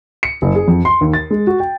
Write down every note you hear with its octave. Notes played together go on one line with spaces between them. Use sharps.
C#7
F#1
G#4
F2
C6
D#2
A6
G#3
F#4
G5